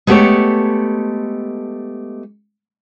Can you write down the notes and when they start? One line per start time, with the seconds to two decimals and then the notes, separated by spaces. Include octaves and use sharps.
0.07 G#3 A3 B3 G4 A4 C#5